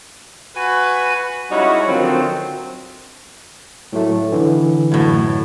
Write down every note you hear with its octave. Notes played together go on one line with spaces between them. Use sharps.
F#4 B4 G#5
G3 G#3 C#4 D#4 E4 F#4
D3 D#3 F3 F#3 C4
A2 F#3 A3
D3 E3
F#2 A2